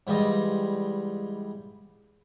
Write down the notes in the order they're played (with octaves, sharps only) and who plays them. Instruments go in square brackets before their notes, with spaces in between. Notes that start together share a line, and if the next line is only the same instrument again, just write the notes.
[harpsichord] G#2 E3 G3 F4 D#5